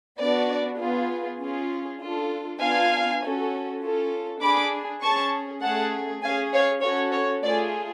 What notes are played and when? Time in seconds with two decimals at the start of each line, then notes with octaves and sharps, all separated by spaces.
0.19 B3 D4 F#4 D5
0.79 B3 F4 G#4
1.40 C#4 F4 G#4
2.00 D4 F4 A4
2.60 B3 D4 F4 F5 G#5
3.22 C#4 F#4 A4
3.82 C#4 F4 A4
4.41 D4 G#4 B5 D6
5.02 C#4 G#4 A5 C#6
5.62 A3 C#4 G#4 F#5 A5
6.23 C#4 G#4 F5 G#5
6.54 C#5 F5
6.83 C#4 F#4 A4 C#5
7.13 C#5
7.43 A3 F4 G#4 D5